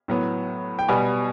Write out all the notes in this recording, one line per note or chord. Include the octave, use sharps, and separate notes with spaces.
A2 F#3 B3
G5
B2 G3 B3 G#5